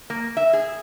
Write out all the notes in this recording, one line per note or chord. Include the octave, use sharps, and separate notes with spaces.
A#3
E5
G#4